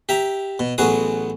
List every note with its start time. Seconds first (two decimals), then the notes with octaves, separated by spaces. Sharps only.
0.09 G4 E5 A#5
0.60 B2
0.78 A1 F#3 B3 F#4 G#4 D#6